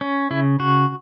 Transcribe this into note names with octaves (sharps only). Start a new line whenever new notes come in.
C#4
C#3 E4
C#3 F#4